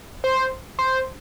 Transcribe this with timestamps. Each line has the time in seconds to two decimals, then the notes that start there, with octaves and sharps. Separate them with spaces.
0.24 C5
0.79 C5